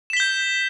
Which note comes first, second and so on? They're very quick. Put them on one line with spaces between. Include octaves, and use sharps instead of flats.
E7 B6 G7 G6